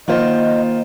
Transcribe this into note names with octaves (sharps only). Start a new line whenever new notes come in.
D#3 A#3 F4 C5 D5 D#5 F#5